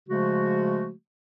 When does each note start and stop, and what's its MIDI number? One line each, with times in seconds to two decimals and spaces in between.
0.08 0.91 49
0.08 0.91 53
0.08 0.91 56
0.08 0.91 57
0.08 0.91 66